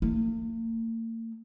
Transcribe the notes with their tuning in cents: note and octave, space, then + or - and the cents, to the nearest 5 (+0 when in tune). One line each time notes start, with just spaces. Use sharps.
A#3 -45